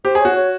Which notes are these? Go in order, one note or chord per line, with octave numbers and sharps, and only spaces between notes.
G4 C5
G#4
F#4 C#5
C#5